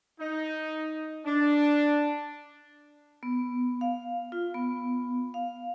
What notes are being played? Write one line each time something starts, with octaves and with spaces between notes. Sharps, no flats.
D#4
D4
B3
F5
F4
B3
F5